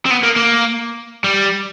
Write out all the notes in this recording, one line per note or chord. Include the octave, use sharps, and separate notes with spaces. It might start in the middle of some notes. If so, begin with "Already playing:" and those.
C4
B3
A#3
A#3
G3